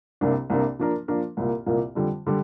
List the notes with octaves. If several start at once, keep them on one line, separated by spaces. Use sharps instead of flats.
C2 C3 A#3 D4
C2 C3 A#3 D4
F3 A#3 D4 A#4
F3 A#3 D4 A#4
C2 A#2 A#3
C2 A#2 A#3
F2 D3 G3
D3 G3